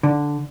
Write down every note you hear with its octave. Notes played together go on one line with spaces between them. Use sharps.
D3